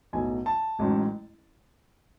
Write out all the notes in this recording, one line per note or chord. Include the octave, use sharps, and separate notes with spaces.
B1 A2 F#3 B3 G#5
A5
A1 G#2 F#3 C#4